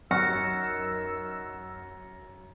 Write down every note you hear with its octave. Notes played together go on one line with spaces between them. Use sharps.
F#2 D#3 F#5 C#6 E6 F6 A#6 C#7